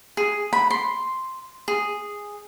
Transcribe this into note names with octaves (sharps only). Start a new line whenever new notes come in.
G#4
B5
C6
G#4